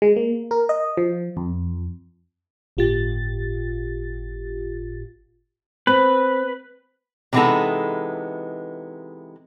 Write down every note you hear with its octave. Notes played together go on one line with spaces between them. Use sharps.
G#3
A#3
A#4
D#5
F3
F2
G1 A2 F4 G4 A6
C4 B4
C3 E3 G#3 B3 D#4 A4